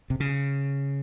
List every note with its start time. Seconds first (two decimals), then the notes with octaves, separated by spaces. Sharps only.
0.10 C3
0.20 C#3